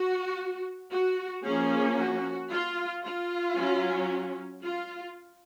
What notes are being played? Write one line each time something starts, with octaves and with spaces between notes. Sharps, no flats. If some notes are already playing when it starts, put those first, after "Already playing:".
Already playing: F#4
F#4
F3 A#3 C#4 G#4
F#4
F4
F4
F#3 C#4
F4